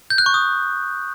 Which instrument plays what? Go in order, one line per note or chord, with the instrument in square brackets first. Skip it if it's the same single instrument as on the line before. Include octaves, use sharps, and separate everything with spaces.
[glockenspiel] G6
F#6
C#6
D#6